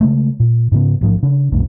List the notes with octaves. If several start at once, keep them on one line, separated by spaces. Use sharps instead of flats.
C#3 G#3 A3
A#2
G#2 C#3 B3
A1 G#2 F3
C#3 D4
B1 F2 A2 D3